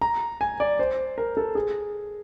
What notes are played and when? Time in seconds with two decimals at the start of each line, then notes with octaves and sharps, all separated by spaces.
0.01 A#5
0.41 G#5
0.60 D5
0.79 C5
1.18 A#4
1.37 A4
1.55 G#4